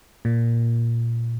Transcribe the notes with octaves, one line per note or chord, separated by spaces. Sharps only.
A#2